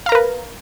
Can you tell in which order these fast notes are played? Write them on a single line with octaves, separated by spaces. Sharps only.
F5 A#5 A#4 B4